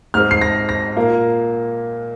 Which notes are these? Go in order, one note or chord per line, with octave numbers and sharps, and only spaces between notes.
G#2 G#3 C4 F6
C7
A#6
A#6
A#2 A#3